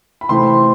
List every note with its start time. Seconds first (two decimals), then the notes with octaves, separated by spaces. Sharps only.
0.21 B5
0.29 C3 E3 A3 C4 C6